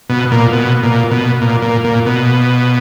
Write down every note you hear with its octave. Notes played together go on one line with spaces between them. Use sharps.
B2
A#2
B2
A#2
B2
A#2
A#2
A#2
B2